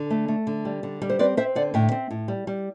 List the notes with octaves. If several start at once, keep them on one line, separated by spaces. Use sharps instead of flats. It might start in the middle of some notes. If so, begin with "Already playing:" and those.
Already playing: D3
A3
A3
D3
G3
D3
G3
C5
C4 B4 D5
C4 C5 E5
D3 D5 F#5
A2 E5 G5
C4
A2
G3
G3